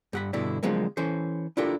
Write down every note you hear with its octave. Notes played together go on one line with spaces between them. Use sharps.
G2 F#5 B5
G2 B2 D3 D4 E4
D3 F3 F#3 G#3 A#3 C4
E3 C#4 A4 C5
D4 E4 F4 G4 A4 A#4